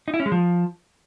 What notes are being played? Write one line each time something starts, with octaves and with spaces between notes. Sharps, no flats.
D#4
E4
C#4
G#3
F3